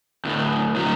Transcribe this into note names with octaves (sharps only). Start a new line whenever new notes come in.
D2 A2
A2 F#3